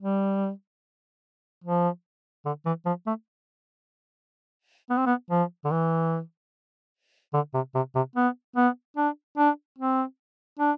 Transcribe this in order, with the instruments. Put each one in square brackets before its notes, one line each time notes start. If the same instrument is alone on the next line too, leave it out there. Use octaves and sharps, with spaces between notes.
[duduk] G3
F3
D3
E3
F3
A3
B3
C4
B3
F3
D3
E3
D3
C3
C3
C3
B3
B3
D4
D4
C4
D4